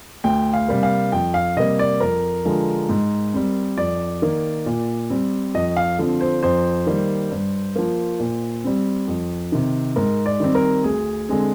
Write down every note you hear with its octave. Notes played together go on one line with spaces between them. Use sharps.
D2 G5
F5
C3 G3 A#3
F5
F2 G5
F5
C3 G3 A#3 D#5
D5
F2 A#4
D3 F3 G#3
G#2
G3 C4
F2 D5
D#3 A#3
A#2
G3 C4
F2 D#5
F5
D3 F3 C4
C5
F2 C5
D#3 G3 A#3
G2
F3 A#3
A#2
G3 C4
F2
C3 D#3
G#2 A#4
D5
D#3 G3 C4
A#4
D2 G#4
D3 G#3 C4